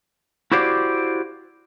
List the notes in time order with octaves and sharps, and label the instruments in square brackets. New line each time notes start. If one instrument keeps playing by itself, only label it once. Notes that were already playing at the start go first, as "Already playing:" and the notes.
[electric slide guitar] E4 F#4 G4 C5 D5 F5